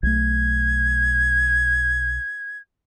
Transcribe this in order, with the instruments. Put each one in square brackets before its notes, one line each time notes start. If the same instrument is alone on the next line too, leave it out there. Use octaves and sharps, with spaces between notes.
[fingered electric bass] B1 A3 [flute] G#6